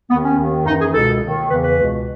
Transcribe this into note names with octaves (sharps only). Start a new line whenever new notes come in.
D#2 D#3 B3
C#4
D#2 D#3
F#2 E3 D#4
G#4
C#2 B2 A4
D#2 D#3
E2 C#3 E3 B4
B4
C#2 B2